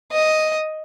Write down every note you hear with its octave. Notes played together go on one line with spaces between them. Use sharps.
D#5